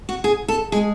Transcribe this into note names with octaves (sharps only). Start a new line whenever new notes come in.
F#4
G#4
A4
G#3 G#4